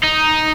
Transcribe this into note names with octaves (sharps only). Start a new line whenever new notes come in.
D#4